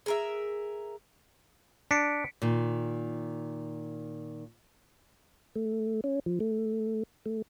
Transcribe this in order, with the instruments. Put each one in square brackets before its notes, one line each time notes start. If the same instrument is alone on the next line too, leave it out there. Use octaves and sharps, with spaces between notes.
[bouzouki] G#4 A#4 E5
[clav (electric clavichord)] D4 [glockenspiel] B6 C#7 D7
[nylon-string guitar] A#2 D#3
[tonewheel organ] A3
C#4
F3
A3
A3